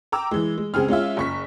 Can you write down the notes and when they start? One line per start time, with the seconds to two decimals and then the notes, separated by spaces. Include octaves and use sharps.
0.12 G5 A#5 D6 E6
0.31 E3 G#3
0.58 G#3
0.74 C#2 C4 G#4 F6
0.88 G#3 C#4 F4 E5
1.17 F#1 C#6 B6